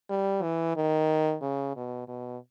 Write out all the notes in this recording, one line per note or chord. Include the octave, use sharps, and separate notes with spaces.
G3
E3
D#3
C#3
B2
B2